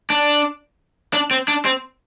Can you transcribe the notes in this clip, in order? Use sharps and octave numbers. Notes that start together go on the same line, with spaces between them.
D4
D4
C4
D4
C4